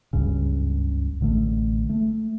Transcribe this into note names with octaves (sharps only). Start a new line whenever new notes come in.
F#1 C#2 G2 C#3
A1 D3 G#3 A3
A3